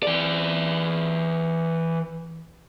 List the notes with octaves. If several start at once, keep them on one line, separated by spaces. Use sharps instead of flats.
E3 D5